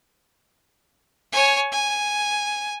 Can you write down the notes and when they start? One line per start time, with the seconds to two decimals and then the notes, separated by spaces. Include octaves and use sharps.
1.32 C#5 G#5
1.72 G#5